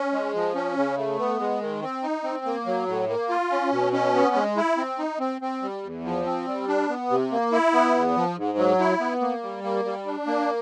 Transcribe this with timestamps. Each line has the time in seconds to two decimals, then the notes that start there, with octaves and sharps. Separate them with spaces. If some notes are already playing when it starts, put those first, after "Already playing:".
Already playing: C#4
0.13 G#3
0.34 F3
0.55 C#4
0.77 C#3
0.97 A3
1.18 B3
1.39 G#3
1.61 D#3
1.82 C4
2.03 D#4
2.24 C4
2.45 A#3
2.66 F#3
2.87 A2
3.08 A#3
3.29 F4
3.51 C#4
3.72 B2
3.93 C#4
4.15 B3
4.35 G#3
4.57 E4
4.78 C4
4.99 D#4
5.20 C4
5.41 C4
5.62 G3
5.83 E2
6.04 F3
6.26 C4
6.47 G3
6.68 D4
6.90 B3
7.10 C3
7.31 A#3
7.52 E4
7.74 B3
7.95 E2
8.16 F3
8.37 G#2
8.58 F#3
8.80 E4
9.00 B3
9.21 A#3
9.43 G3
9.64 A#3
9.85 G3
10.06 D4
10.27 A#3